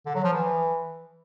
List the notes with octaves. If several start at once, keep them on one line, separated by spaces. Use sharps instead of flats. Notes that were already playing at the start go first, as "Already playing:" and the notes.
D3
F#3
F3
E3